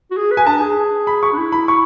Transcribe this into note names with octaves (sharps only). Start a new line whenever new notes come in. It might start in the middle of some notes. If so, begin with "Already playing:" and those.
F#4
G#4
B4
G#5
D4 A5
G#4
B5
C#6
D4
E4
B5
C#6